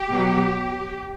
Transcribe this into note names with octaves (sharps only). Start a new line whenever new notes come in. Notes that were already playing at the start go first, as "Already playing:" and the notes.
Already playing: G4
B2 F#3